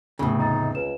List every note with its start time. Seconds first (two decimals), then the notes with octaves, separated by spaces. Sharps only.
0.19 F1 E2 A2 C#3
0.39 D#4 D#5 A#5 A6
0.75 C#2 B4 E7